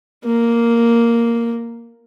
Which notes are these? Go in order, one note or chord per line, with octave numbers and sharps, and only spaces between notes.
A#3